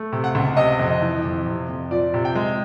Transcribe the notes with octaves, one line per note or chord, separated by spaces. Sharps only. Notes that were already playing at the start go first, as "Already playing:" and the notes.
Already playing: A3
C3
F#5
C#2
C3 D#5
F2
D#5
E3
F2
C3
F2
F3 D5
C3
G5
G#3